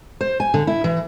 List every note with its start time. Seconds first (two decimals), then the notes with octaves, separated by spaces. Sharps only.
0.21 C5
0.40 G#5
0.54 D3
0.67 E4
0.84 E3